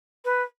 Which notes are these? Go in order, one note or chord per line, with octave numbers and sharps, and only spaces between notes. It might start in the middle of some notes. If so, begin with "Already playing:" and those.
B4